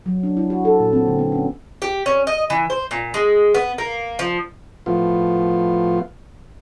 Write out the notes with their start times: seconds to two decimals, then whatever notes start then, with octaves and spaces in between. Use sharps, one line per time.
0.06 F#3
0.23 D4
0.37 E4
0.50 F#4
0.65 A4
0.80 A#2
0.93 C4
1.06 D3
1.19 B3
1.32 C#4
1.82 G4
2.06 C#4
2.27 D#5
2.50 E3
2.70 C5
2.91 A#2
3.14 G#3
3.54 B3
3.78 A#3
4.19 F3
4.86 A2 F3 B3 F4